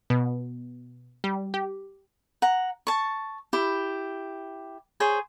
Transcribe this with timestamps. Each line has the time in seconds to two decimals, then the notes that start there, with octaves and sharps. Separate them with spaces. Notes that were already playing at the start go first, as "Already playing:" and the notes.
0.10 B2
1.24 G3
1.54 G4
2.42 F#5 A#5
2.87 A5 C#6
3.53 E4 G4
5.00 G#4 C5 C#5